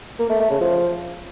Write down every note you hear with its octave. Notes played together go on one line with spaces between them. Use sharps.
A#3
A3
A3
C#3
F3